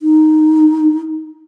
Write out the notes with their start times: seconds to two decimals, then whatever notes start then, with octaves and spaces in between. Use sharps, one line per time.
0.01 D#4